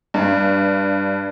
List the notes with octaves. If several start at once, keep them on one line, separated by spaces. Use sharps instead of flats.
G2